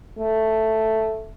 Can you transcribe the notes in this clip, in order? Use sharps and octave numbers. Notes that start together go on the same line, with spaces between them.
A3